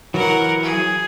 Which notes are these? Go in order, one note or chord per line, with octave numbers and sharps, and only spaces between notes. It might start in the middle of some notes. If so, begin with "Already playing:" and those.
E3 F#3 A#4 F#5
G#4